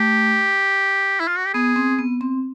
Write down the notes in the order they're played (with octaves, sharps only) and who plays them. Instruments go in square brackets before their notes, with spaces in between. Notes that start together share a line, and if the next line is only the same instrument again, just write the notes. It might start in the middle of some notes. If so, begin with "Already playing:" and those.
Already playing: [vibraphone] A3 [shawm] G4
[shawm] E4
F4
F#4
G4
[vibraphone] B3 [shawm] G#4
[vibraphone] C4
B3
C4